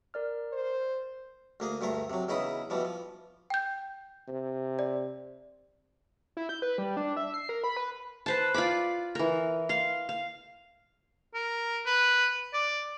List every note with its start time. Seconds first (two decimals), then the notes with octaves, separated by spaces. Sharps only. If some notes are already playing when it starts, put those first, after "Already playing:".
0.14 A#4 D5 F6
0.53 C5
1.60 D2 A#3 G#4
1.81 D2 G2 A3 A#4
2.10 C3 F#3
2.28 E2 C#3 D#4 E4 B5 D#6
2.70 B2 E3 F3 G3
2.85 F3
3.50 G5 G6
4.28 C3
4.79 D5
6.37 E4
6.49 G6
6.62 B4
6.78 G3
6.97 D4
7.17 E5
7.34 C7
7.49 A#4
7.64 B5
7.77 B4
8.26 B4 C5 A5
8.54 F4 D5 B5 D6
9.15 E3 A#4
9.69 F5 C6
10.09 F5
11.34 A#4
11.86 B4
12.54 D5